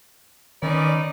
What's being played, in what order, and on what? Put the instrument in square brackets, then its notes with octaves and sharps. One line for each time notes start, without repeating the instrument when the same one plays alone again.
[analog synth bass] D#3 [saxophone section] C#4 B4 D5 [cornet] D#4